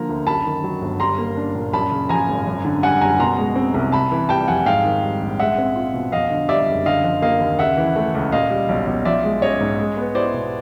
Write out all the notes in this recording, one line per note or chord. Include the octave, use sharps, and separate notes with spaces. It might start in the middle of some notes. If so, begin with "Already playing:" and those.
Already playing: D3 F3 A#3 A#5
D2
F#2 A5 B5
D#3
F#3
G1
G3 A#5 C6
A#3
D4
A#2
F#2 A5 B5
C#3
F3 G#5 A#5
G#1
F#2
D3
G3 F#5 G#5
F#1 G#5 A#5
B2 A#5 C6
G#3
C4
C2
C3 A5 B5
E3
G3 G5 A5
F2 F#5 G#5
G#2 F5 G5
D#3
G3
A#1
G#3 E5 F#5
C4
F4
B2
F2 D#5 F5
D3
G3 D5 E5
F#1
D3 D#5 F5
F3
A#3 D#5 F5
D#2
C#3 E5 F#5
E3
A3
C#2
A#2 D#5 F5
G3
B1
B1
F3 D5 E5
G#3
C#4 C#5 D#5
G#2
G#3
B3
E4 C5 D5
B2